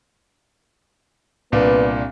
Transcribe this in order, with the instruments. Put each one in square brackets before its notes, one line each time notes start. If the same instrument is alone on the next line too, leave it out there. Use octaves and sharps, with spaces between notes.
[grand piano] C2 A#2 D4 [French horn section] B3 B4